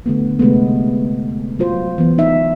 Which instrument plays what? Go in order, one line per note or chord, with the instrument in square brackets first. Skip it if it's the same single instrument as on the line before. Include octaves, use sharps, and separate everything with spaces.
[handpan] D3 A3 B3
C3 G#3 A3 B3
F#3 F4 C5
E3 B3
D#4 E5